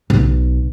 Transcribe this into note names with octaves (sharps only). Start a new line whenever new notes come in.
B1